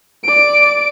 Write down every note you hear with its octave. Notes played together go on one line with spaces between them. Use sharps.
D5 D7